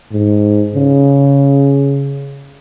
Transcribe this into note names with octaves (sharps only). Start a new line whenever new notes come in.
G#2
C#3